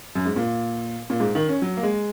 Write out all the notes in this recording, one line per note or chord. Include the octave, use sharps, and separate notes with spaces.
F#2
G#2
A#2
A#2
G#2
D#3
C#4
F#3
A#3
G#3